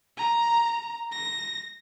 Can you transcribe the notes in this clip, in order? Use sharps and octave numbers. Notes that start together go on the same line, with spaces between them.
A#5
A#6